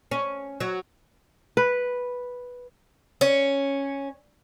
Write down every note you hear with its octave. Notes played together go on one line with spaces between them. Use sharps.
C#4
F#3
B4
C#4